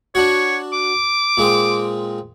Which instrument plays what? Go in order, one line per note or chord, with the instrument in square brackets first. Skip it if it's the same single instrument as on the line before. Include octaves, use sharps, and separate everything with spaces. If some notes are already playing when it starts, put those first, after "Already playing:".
[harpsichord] D4 F#4 [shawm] C#5
[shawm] D6
[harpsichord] A#2 G#3 C4